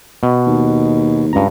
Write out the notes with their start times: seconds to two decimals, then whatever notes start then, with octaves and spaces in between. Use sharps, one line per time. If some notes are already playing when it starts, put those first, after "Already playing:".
0.23 B2
0.47 D#2
1.33 C#2 G2 A#5